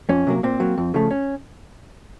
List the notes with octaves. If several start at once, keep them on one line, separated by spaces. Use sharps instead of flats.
F2 C#4
C3 F#3 A#3
A#2 C4
F#3 A#3
F2
C#3 F3 A3
C#4